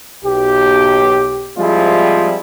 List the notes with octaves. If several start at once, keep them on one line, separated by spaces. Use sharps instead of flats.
B1 G4
F3 G3 G#3 C4 E4 F4